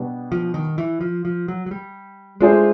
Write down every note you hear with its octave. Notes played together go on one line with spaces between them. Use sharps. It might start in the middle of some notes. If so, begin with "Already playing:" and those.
Already playing: B2 G3 B3 D4
F3
D#3
E3
F3
F3
F#3
F#3
G3
G#3 A3 D4 F4 G#4 C5